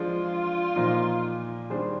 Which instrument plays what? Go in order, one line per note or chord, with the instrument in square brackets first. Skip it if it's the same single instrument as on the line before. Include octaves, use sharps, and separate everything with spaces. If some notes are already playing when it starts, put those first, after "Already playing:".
Already playing: [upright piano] F3 G#3 D4 [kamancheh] F4
[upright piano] A#2 F3 A#3 D#4
D#3 G3 D4 G#4 C5